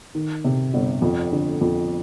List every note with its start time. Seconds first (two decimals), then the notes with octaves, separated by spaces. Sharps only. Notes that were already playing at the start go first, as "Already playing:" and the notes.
0.15 D#3
0.44 C3
0.74 G1
1.02 F2
1.32 D3
1.61 F2